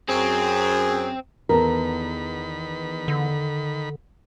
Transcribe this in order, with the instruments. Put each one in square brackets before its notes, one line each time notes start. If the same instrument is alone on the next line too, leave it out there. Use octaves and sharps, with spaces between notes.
[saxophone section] F#2 [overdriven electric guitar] C4 [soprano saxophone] G#4
[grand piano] E2 B3 [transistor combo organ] D#3 B5 [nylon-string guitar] A4 A#4
[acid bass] D3